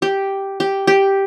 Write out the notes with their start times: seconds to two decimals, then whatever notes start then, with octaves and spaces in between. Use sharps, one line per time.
0.02 G4
0.60 G4
0.87 G4